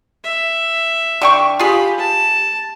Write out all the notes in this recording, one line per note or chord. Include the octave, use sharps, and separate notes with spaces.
E5
D3 G5 C#6
F4 G4 G#4 B5
A5